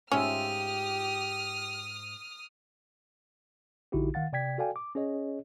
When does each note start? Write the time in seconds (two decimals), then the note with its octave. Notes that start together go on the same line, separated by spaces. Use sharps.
0.12 G#2 C#4 F4 G4 E5 D#6 F6
3.92 A#1 D3 D#4 E4 F#4 G4
4.14 D#3 F5 F#5 A6
4.33 C3 D5 G5 G#6 B6
4.58 F#4 A4 D5 F5 G5 G#5
4.76 D6
4.95 C#4 G#4 C#5 D#5